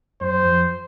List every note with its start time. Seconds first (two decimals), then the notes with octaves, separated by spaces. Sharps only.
0.21 F#2 C5
0.43 F2